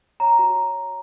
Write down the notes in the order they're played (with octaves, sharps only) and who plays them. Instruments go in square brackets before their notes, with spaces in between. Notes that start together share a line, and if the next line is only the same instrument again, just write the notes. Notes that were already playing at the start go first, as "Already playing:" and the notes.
[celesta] C#5 A#5
F#4